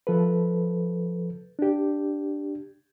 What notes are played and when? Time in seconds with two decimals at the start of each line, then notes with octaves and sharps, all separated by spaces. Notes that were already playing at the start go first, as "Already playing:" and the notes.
0.07 F3 A4 B4
1.59 D4 G4